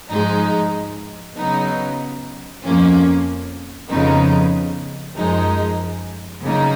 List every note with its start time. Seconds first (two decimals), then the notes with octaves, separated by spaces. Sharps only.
0.11 G#2 F3 G#3 D#4
1.37 C#3 F#3 B3 D#4
2.64 F2 F3 A#3 C#4
3.90 F2 C#3 F3 B3 D#4
5.17 F#2 F3 G#3 D#4
6.44 C#3 F#3 A#3 D#4